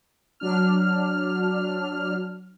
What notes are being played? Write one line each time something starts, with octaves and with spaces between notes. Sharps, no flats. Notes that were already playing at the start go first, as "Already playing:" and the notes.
F#3 D4 F6